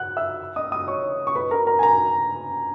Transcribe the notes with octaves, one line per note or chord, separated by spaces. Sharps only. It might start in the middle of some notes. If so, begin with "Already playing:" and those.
Already playing: F#5 F#6
E5 E6
D#5 D#6
D#5 D#6
C#5 C#6
C#6
B4 B5
A#4 A#5
A#4 A#5
G#5
A#4 A#5